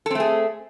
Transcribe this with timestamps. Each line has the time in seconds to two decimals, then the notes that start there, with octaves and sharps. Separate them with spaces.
0.06 A4
0.11 C4
0.15 A3
0.20 G#4